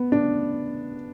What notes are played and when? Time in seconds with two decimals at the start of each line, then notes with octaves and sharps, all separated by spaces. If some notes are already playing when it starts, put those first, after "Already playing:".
Already playing: B3
0.12 D4